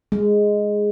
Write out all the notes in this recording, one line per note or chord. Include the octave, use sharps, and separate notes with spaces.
G#3